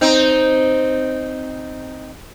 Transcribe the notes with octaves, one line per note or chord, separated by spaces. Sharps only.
C4 D#4